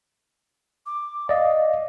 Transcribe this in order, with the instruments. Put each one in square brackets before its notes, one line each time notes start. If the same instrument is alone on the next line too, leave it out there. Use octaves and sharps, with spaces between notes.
[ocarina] D6
[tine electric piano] D5 D#5 [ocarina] F5